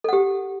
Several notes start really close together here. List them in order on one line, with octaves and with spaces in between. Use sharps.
A4 F#5 G4